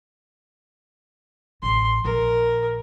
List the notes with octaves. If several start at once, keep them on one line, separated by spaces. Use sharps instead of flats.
A1 C6
A#1 A#4